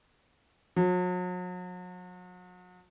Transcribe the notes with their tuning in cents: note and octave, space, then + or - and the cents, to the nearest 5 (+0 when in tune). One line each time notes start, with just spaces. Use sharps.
F#3 -40